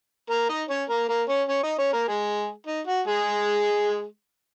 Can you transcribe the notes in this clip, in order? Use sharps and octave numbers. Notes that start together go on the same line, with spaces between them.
A#3 A#4
D#4 D#5
C#4 C#5
A#3 A#4
A#3 A#4
C#4 C#5
C#4 C#5
D#4 D#5
C#4 C#5
A#3 A#4
G#3 G#4
D#4
F#4
G#3 G#4